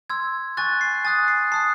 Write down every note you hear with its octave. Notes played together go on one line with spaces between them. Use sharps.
C6 E6 G#6
G#5 C#6 F#6 A6
C7
G#5 D#6 F#6 A6
C7
A5 D#6 F#6 C7